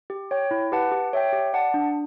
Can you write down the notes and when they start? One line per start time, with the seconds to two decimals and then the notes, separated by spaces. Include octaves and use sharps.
0.10 G4
0.31 C#5 G5
0.51 E4
0.72 G4 B4 F#5 A5
0.92 G4
1.13 C#5 E5 G5
1.33 G4
1.53 D5 F#5 A5
1.74 D4